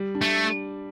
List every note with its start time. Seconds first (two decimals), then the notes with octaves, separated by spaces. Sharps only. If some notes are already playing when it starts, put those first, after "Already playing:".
Already playing: G3
0.15 D4
0.22 A3